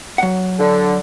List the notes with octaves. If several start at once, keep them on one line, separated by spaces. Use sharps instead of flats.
F#3 F#5
D3